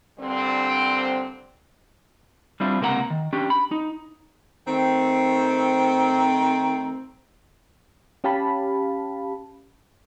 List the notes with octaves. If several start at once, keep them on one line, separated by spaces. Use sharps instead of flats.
G2 A#2 D3 G3 C4
G3 C4 D4 E4 F4
C#2 C3 A#3 B3 F#5 A#5
D#3
C#4 D4 G4
B5
D#4
D#3 A3 C4
C#4 G4 F5 A5 B5